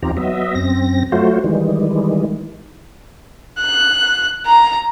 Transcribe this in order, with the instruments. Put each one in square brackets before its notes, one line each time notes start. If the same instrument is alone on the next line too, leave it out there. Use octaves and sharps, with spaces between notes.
[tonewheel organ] E2 C4 D#4 F4 G4 A#5
F#3 B3 D#5 E5
F#2 C4 A#6
F#3 A3 F4 F#4 C5
D#3 E3 G3 G#3
[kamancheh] F#6
A#5